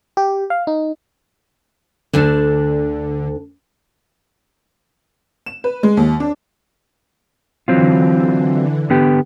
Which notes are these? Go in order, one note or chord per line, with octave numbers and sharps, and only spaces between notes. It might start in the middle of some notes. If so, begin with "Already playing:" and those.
G4
F5
D#4
D2 D3 D4 A5
E7
B4
G#3
D#2
D4
D3 E3 F#3 C4 F4
D3 B3 G4